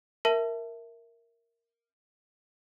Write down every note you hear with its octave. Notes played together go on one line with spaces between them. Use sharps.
A#4 E5 A5